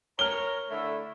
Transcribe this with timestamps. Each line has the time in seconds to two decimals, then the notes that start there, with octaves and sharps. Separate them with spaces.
0.19 A#4 C#5 A#5 F6 G7
0.70 D3 A3 E4